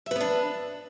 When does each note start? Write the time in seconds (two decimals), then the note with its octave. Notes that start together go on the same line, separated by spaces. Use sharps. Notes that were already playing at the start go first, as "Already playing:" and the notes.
0.06 E5
0.11 B4
0.16 B3
0.21 D4